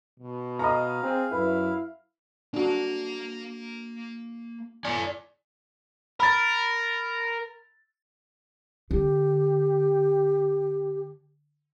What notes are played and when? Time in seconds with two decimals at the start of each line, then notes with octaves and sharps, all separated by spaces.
0.20 B2
0.59 D#5 F5 A#5
1.03 C4 G#4
1.32 F#2 E4 B4
2.54 A#3 D4 F#4 F5
4.85 A4 C#5 D5 G#5
6.20 A#4 B5 A6
8.91 D3 G4